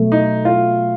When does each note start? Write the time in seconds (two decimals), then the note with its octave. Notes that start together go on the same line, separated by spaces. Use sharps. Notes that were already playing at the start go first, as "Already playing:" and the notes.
Already playing: B2 F#3 A3
0.12 D#4
0.45 F4